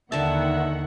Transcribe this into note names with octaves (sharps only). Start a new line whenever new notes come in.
D#2 D3 D#3 E5 F#5 A5